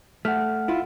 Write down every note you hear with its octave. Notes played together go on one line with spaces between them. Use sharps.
A3 F#5 F6
E4 F4